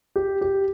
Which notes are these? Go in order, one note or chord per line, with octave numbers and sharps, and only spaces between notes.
G4
G4